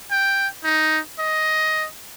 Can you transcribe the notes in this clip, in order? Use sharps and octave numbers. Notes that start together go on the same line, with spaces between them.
G5
D#4
D#5